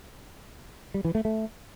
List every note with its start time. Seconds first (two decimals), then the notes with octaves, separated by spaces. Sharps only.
0.94 G3
1.05 E3
1.15 A3
1.25 A3